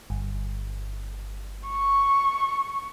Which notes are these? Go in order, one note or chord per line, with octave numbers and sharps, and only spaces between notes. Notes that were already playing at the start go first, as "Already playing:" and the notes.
G1
C#6